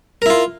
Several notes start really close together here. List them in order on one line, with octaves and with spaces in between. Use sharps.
A#4 E4 F4